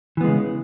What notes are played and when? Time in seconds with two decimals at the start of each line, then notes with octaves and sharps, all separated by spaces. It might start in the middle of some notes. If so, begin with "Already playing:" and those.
0.17 E3
0.21 B3
0.24 G#3
0.27 C#3